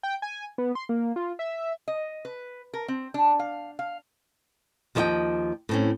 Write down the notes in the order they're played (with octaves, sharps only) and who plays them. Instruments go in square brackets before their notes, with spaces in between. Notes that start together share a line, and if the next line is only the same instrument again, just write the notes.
[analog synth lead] G5
G#5
B3
C6
A#3
F4
E5
[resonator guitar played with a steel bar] D#5
B4
A#4
C4
D4
F5
F5
[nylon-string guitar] D#2 F3 A4 C#5 D#5 G5
A2 C4 C#4